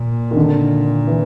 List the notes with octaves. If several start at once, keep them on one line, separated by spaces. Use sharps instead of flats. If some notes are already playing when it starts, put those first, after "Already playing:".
Already playing: A#2
D#3
D3
E3